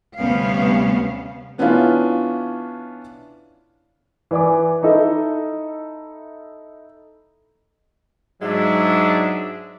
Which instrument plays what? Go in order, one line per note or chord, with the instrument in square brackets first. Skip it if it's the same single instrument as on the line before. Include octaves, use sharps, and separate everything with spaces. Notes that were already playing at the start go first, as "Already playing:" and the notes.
[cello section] D2 C3 G3 B3 C#4 F5
[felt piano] E3 B3 C#4 D4 E4 F4
[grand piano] E3 B4 D5 G#5 D6
D#4 E4 A4 D#5 E5
[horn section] G#2 F#3 G#3 D4 E5